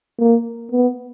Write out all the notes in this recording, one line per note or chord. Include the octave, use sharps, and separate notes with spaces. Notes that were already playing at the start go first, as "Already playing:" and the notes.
A#3
B3